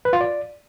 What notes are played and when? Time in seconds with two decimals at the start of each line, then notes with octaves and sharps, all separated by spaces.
0.05 B4
0.13 F4
0.21 D5